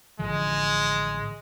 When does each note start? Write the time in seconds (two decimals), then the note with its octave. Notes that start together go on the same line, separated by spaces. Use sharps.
0.19 A1 D3 F3 G#3